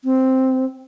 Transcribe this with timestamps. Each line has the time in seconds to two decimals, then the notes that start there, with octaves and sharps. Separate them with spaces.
0.05 C4